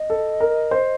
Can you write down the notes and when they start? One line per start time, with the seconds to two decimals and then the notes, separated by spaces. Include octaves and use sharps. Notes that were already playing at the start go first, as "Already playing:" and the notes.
Already playing: D#5
0.10 A4
0.40 A#4
0.71 C5